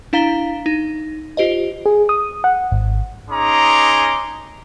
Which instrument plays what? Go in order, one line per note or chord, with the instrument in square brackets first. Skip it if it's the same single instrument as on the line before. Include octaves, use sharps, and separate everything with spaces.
[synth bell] D4 E4 F5 A#5 B6 G7
D#4
F4 G4 C5 D#5
[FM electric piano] G#4
D#6
F#5
G#1
[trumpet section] C#4 D#4 G#4 A#5 C6 D6